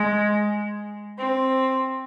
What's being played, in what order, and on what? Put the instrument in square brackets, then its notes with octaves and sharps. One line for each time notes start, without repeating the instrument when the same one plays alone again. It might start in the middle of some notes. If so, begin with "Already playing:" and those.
Already playing: [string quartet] G#3
C4